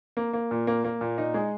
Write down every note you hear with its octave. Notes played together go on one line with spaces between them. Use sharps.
A#3
A#3
A#2
A#3
A#3
A#2
D#4
G#3